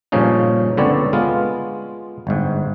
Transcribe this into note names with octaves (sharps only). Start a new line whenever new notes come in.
G2 A#2 C#3 F3 C#4 D#4
C#2 D3 B3 C4 C#5 D5
G#3 B3 F4
G1 G#2